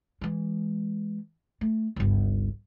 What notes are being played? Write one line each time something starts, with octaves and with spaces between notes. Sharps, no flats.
E3 G#3
A3
G1 C#2